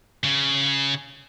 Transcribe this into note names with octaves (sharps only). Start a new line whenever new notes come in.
C#3